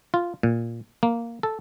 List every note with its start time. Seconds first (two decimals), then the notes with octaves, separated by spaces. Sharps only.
0.14 F4
0.43 A#2
1.03 A#3
1.43 A4